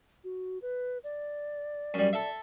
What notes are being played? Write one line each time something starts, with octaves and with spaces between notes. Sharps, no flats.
F#4
B4
D5
F#2 G3
A4 E5